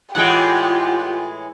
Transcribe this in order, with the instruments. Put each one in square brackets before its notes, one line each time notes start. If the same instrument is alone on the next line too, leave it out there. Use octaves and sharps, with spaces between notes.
[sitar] A2 E3 G#3 [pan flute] F4 [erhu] G4 [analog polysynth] F#5 G5